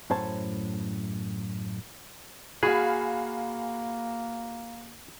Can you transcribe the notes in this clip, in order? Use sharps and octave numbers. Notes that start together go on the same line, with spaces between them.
F#2 A2 C5 C#5 A5
A#3 F#4 G#4 F5 G#5 B5